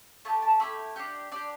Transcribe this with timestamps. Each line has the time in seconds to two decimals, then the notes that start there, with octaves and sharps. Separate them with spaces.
0.25 A3 E4 G4 A5
0.42 A5
0.60 A3 E4 G4 B5
0.96 D4 G4 F#5
1.31 D4 G4 D5